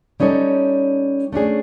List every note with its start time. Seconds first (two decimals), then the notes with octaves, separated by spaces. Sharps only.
0.20 G3 C#4 D#4 A4 C#5
1.33 A3 C#4 D4 G#4